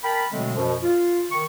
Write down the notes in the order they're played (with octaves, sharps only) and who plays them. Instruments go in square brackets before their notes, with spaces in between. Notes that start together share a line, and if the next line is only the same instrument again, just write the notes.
[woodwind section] A#4 G5 A5 B5
B2 D3 F#3 G#3 A3 C4
F#2 B2 F3
F4
D#3 C#6